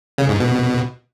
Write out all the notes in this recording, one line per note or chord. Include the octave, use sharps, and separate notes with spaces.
C#3
G#2
B2